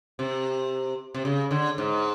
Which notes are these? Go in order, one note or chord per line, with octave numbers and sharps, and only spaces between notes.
C3
C3
C#3
D3
G#2